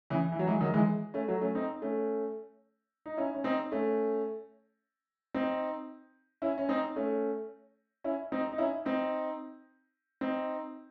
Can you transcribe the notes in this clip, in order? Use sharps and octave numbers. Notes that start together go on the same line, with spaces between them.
C#3 E3
E3
F#3
E3 G#3
D#3 F#3
E3 G#3
A3 C#4
F#3 A3
A3 C#4
C4 D#4
A3 C#4
D#4
C#4 E4
C#4
C4 D#4
A3 C#4
C4 D#4
C#4 E4
C#4
C4 D#4
A3 C#4
C#4 E4
C4 D#4
D#4
C#4 E4
C4 D#4
C4 D#4